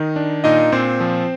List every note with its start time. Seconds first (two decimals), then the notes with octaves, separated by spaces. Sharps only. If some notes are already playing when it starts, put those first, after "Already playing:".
Already playing: D#3 D#4
0.16 D4
0.44 A#2 D#4 D#5
0.72 A#2 C4 C5
1.00 F3